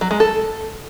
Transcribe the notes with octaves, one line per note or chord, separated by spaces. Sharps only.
F#3
G#3
A4